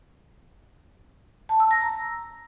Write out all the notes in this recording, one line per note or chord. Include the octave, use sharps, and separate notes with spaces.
A5
E6
A#6
A#5